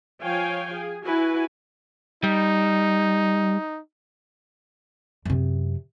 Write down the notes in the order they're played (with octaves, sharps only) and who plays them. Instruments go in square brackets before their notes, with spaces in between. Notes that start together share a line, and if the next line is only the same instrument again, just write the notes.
[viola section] F3 C#5 F5 G5 G#5
G#4
E4 F#4 B4 G#5
[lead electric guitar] G3 [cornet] D#4
[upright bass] F#2 C3